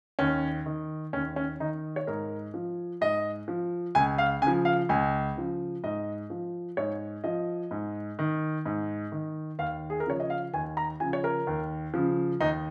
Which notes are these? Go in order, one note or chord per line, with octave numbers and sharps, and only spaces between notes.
D#2 C#4
D#3
D#2 C#4
C#4
D#3 D#4
C#5
G#2 A#4
F3
G#2 D#5
F3
C#2 G#5
F5
C#3 G#5
F3
F5
C#2 G#5
C#3 F3
G#2 D#5
F3
G#2 C#5
F3 D#5
G#2
D#3
G#2
D#3
D#2 F5
G#4
A#4
C#3 F3 C#5
D#5
F5
D#2 G#5
A#5
C#3 F3 G#5
C#5
A#4
D#2
C#3 F3
D#2 D#4